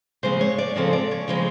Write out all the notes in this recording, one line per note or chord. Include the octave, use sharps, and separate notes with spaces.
C#3 F3 G#3 C4 C5
C#5
D5
C#3 F3 G#3 C4 A4
D5
C#5
C#3 F3 G#3 C4 C5